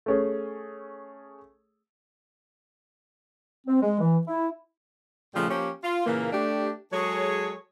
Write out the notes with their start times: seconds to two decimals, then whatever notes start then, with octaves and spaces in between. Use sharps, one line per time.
0.06 A3 C#4 G#4
3.67 C4
3.82 G#3
4.00 E3
4.27 E4
5.35 A#2 C#3 F3 G3 A3 A#3
5.50 F3 A#3 C#4 G4
5.83 F4
6.06 A#2 C#3 E3 A#3
6.32 A3 D4 G4
6.93 F#3 G#3 G#4 A4 C#5